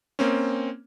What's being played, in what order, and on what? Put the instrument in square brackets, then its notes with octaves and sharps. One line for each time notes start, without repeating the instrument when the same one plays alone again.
[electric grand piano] A#3 C4 C#4